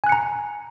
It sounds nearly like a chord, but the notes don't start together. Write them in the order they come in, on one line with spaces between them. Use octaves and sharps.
G#5 F#6 C#7 A#5